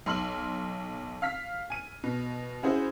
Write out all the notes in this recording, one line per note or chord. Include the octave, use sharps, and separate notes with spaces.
B1 C6 F6 F#7
F5 F6 B6
G#5 D#7
B2
C#4 E4 F#4 G#4 C5